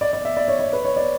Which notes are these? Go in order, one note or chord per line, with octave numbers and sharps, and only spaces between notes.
D5
D5
E5
D5
C#5
D5
B4
C#5
D5